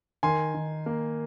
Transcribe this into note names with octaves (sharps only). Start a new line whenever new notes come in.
D#3 G#5 C6
D#3
A#3